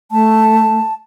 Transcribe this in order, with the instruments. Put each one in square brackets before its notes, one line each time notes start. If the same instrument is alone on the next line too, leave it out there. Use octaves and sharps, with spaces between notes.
[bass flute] A3 [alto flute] A5